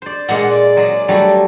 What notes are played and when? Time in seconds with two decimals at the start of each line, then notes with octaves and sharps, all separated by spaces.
0.02 C5 D5
0.29 A#2 G#3 F#5
0.50 D5
0.76 F#3 G#3
1.08 F#3 G3 A3